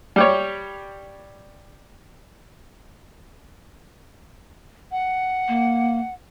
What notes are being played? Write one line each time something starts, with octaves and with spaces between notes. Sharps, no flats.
G3 G4 C#5
F#5
A#3